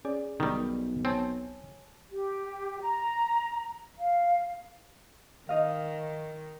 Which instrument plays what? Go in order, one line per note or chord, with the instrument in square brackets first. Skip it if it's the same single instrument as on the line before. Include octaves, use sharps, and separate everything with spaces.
[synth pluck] C#4 G#4 D5
[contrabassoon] B1 [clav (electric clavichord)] D#3 G3
[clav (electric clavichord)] C4 [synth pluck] C#5 G#5 A5
[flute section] G4
A#5
F5
[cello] D#3 [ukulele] D#4 D#5 F5